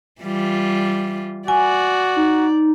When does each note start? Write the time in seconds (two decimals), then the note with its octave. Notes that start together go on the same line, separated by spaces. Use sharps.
0.22 E3 G3 F4
1.48 F#4 D5 G#5
2.16 D#4